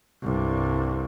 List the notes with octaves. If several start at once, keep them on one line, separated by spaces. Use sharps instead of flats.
C2 G2